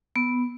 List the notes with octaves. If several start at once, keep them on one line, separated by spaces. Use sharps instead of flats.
B3